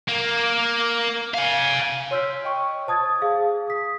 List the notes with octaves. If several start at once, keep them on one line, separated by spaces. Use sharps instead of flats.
A#3
F5 G#5
C#5 C6 E6 F6 G6 B6
D#5 G5 C#6
C5 A5 D#6 G#6 A6
G#4 F5
D#6 B6